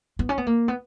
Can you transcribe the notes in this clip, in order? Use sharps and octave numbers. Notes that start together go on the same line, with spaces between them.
B3
C#4
B3
A#3
B3